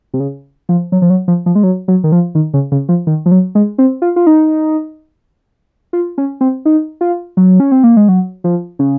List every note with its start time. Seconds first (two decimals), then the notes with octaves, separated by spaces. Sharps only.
0.14 C3
0.20 C#3
0.69 F3
0.92 F#3
1.02 F3
1.10 F#3
1.28 F3
1.46 F3
1.55 G#3
1.63 F#3
1.88 F#3
2.04 D#3
2.12 F3
2.35 D#3
2.54 C#3
2.72 C#3
2.89 F3
3.07 D#3
3.26 F3
3.31 F#3
3.55 G#3
3.78 C4
4.02 F4
4.16 F4
4.27 D#4
5.93 F4
6.18 C#4
6.41 C4
6.65 D#4
7.01 F4
7.37 F#3
7.60 C#4
7.71 C4
7.84 A#3
7.97 G#3
8.08 F#3
8.44 F3
8.79 C#3